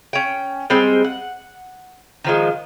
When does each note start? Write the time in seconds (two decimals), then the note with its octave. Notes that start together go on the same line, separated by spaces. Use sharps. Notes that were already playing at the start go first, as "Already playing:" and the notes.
0.13 C#4 G5
0.70 G3 G#3 C4
1.04 F#5
2.24 D#3 F3 G#3